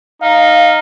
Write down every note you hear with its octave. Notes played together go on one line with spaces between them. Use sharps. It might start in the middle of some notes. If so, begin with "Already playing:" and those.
D#4 F5